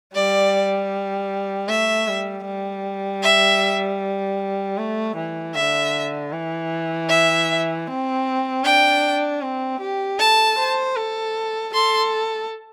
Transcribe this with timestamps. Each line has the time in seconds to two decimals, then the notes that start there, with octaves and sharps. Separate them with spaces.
0.15 G3 D5
1.68 A3 E5
2.08 G3
2.46 G3
3.23 E5
4.78 A3
5.16 E3
5.55 D3 E5
6.32 E3
7.09 E5
7.87 C4
8.64 D4 G5
9.42 C4
9.81 G4
10.19 A4 A5
10.58 C5
10.96 A4
11.74 A4 C6